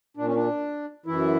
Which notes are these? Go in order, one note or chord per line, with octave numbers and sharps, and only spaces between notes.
A#2 D4
C#4
D4
F#2 E3 E4